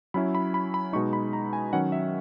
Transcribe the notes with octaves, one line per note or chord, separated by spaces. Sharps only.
F#3 C#4 E4 B5
B5
B5
B5
B2 G#3 D#4 C#6
B5
A#5
G#5
D#3 F#3 C#4 F#5
E5